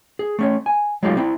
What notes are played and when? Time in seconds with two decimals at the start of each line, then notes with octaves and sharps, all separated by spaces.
0.19 G#4
0.39 A3 C#4 C#5
0.66 G#5
1.03 F#3 G#3 A3 D#4 F4 G4
1.17 C4 E4